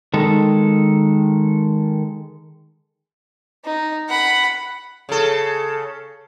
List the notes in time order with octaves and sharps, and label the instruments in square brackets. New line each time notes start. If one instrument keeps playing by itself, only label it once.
[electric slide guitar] D#3 G#3 A4
[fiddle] D#4
F#5 B5
[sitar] C#3 A4